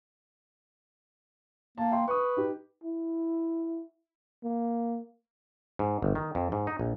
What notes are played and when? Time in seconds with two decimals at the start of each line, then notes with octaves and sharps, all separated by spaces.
1.78 A#3 A5
1.91 E5 G5 C6
2.08 B4 C#6 D#6
2.37 D#4 G4
2.84 E4
4.44 A#3
5.79 G#2
6.02 G1
6.15 D#3
6.35 F2
6.52 G#2
6.67 D#4
6.79 A#1